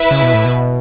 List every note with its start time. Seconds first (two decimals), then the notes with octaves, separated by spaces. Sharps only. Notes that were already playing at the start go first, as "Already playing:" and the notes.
Already playing: E4 B4 E5
0.11 C#3
0.22 B2
0.34 A2
0.45 B2